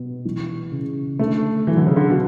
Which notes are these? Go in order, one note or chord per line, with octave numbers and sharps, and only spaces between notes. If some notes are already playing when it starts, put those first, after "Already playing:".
Already playing: B2 B3
E3
C#3
D3 A3
E3 F#3
D3
C#3
D3
B2